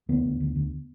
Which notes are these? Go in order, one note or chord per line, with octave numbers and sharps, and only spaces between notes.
D2 B3
D2
D2
D2